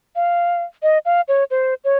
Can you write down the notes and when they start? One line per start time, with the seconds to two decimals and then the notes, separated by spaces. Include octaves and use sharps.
0.16 F5
0.83 D#5
1.05 F5
1.28 C#5
1.51 C5
1.84 C#5